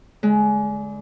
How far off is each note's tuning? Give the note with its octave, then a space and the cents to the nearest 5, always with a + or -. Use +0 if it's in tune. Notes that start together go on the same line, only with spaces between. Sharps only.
D3 -20 G#3 +20